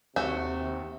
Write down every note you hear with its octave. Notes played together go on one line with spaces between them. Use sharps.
D#2 C3 A3 F#4